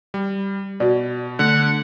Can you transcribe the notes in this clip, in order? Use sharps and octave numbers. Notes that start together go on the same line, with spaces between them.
G3
B2 F#4 D5
D3 A3 F#5